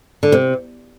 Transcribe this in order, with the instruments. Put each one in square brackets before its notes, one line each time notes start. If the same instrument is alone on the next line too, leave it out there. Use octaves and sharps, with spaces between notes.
[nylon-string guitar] D3
C3